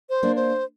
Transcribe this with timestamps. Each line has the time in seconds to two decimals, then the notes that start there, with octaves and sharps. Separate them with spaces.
0.09 C5
0.23 A#3 D4
0.36 C5